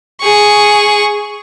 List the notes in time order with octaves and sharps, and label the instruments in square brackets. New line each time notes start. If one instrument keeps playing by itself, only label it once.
[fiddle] G#4 C#6